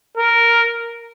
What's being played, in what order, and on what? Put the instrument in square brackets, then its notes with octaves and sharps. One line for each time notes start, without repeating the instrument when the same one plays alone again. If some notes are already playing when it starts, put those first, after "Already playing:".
[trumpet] A#4